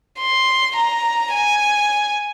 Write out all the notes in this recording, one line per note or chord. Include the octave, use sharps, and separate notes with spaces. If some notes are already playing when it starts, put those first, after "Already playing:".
C6
A#5
G#5